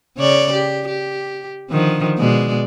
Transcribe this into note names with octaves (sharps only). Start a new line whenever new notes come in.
C#3 C#5 D5
G4
G4
D3 D#3 F3
B2 G#3 D5